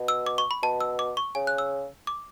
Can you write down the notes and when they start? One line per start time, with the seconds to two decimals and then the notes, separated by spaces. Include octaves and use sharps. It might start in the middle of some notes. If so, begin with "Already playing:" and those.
Already playing: B2
0.08 E6
0.26 D6
0.38 C#6
0.51 B5
0.62 B2 A5
0.81 E6
0.99 D6
1.17 C#6
1.35 C#3 G#5
1.47 F#6
1.58 E6
2.07 D6